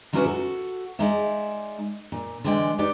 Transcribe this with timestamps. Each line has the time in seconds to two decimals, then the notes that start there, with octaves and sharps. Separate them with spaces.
0.13 D3 F#3 C#4 E4 F#4 B4
0.26 F#4 A4
0.99 G#3 D#4 D5 E5
2.12 A#2
2.44 D3 E3 G#3 D5 G5
2.78 D#4 G4 B4 D5